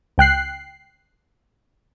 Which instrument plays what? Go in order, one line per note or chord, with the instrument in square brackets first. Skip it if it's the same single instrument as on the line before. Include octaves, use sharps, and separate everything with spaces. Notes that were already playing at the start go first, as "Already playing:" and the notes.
[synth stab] C#2 G5 F#6 C7